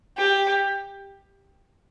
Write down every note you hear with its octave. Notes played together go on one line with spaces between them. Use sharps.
G4